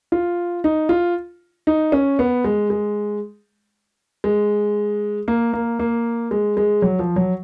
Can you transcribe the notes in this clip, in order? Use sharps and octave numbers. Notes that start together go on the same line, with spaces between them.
F4
D#4
F4
D#4
C#4
B3
G#3
G#3
G#3
A#3
A#3
A#3
G#3
G#3
F#3
F3
F#3